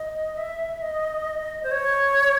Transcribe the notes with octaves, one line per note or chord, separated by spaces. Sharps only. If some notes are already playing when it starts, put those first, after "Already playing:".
Already playing: D#5
E5
D#5
C5
C#5